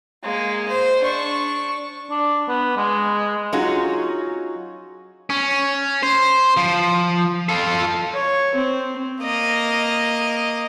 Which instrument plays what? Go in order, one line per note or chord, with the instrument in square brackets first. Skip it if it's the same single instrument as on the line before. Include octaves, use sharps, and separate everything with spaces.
[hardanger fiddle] G#3 A#3
C5
D4 C#6
[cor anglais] D4
B3
G#3
[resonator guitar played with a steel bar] F#3 C#4 D#4 F4 F#4 G#4
[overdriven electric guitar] C#4
C5
F3
F4 A4
[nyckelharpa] C#5
C4
[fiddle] A#3 D#5